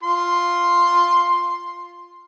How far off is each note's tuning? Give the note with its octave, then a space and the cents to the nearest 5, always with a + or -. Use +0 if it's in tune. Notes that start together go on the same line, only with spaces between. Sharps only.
F4 +0 C6 +5